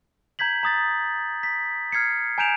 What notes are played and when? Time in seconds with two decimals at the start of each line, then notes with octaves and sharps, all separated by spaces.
0.39 A#5 G6 G#6 B6 F#7
0.63 A#5 D#6 A6
1.43 B6
1.92 F6 G#6 C7 C#7
2.38 G#5 A#5 G6 D7 E7 F7